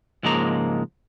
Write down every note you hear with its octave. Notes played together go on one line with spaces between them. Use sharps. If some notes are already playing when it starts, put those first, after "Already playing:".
C#2 G#2 F3 G#3 A#3 A#5